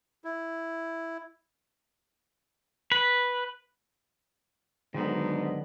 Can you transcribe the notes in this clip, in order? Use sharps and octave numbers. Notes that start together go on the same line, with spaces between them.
E4
B4
G#2 D3 D#3 F#3 B3